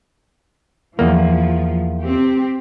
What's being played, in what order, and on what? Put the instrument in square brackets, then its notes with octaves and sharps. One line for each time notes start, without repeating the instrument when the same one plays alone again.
[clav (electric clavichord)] E2 A#3 [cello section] F3
[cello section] C4 G4